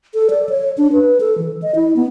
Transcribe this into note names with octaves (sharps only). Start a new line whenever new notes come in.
A4
D5
C#5
D4
B4
A4
E3
D#5
E4
B3